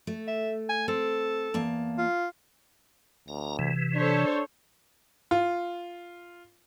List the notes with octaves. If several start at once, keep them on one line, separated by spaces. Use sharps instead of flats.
A3
E5
G#5
C4 A4
E2 A#3 A5
F4
D2 A#5
C3 E3
D4 A4 C5 C#5
F4